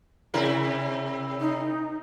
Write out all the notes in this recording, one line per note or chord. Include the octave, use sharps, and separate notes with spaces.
C3 E4 A#4
D#4